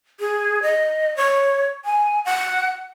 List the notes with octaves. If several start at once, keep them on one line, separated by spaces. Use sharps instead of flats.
G#4
D#5
C#5
G#5
F#5